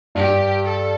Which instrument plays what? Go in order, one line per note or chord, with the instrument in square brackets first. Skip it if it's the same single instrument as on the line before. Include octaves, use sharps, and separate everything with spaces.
[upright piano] G2 [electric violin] G4
[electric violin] A4